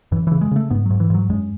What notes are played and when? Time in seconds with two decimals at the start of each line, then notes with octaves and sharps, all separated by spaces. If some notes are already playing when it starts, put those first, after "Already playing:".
0.12 F#2 E3
0.27 C#3 E3
0.41 G#3
0.51 C#3 A3
0.70 G#2 B3
0.86 G#2 F#3
1.00 E3
1.10 G#2 F#3
1.30 F#2 G#3